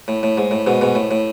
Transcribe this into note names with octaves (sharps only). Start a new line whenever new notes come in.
A2
A2
G#2
A2
G#2 B2
G#2 B2
A2
A2